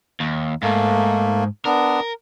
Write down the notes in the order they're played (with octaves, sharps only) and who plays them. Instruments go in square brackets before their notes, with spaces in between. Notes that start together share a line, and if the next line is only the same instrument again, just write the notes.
[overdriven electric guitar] D#2
[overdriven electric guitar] G#2 [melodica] A3 A#3
[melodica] B3 D4 [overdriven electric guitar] A#4